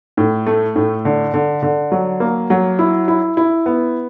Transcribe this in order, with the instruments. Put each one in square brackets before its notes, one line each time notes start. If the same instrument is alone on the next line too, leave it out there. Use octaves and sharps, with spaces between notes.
[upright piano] A2
A3
A2
D3
D3
D3
F#3
A#3
F#3
E4
E4
E4
B3